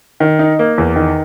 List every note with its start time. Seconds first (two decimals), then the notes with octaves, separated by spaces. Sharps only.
0.20 D#3
0.39 D#4
0.59 A#3
0.78 E2
0.96 D#3